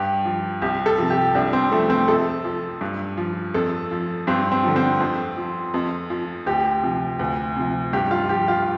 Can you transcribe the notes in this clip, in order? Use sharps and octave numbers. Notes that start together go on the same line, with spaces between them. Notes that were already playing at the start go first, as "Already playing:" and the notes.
Already playing: G2 G4
F3
C2 G4
A4
C3 F3
G4
C2 D4
C4
C3 F3 A3
C4
F2 A4
F3
G2
F3
F2 A4
F3
G2 C4
C4
D3 F3
C4
F2
F3
F2
F3
D2 G4
C3 F3
D2
C3 F3
G2 G4
F4
F3 G4
F4